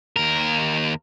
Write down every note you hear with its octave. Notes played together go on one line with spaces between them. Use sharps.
D#2 A#4